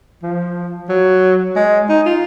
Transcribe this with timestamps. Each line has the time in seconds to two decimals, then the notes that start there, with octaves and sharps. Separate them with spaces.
0.23 F3
0.89 F#3
1.56 G#3
1.89 D#4
2.06 F4